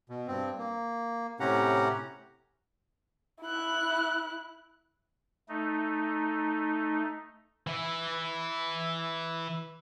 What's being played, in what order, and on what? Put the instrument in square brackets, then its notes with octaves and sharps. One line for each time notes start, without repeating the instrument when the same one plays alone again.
[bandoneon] B2
G2 C4
A#3
A2 C3 C#4 G4 F#5 A#5
[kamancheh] E4 F#6
[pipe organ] A3 D#4
[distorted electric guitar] E3 E4